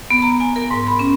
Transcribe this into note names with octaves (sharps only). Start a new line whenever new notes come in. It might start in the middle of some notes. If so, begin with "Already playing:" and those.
B3
A#5
G#5
A#4
G#2
B5
C#4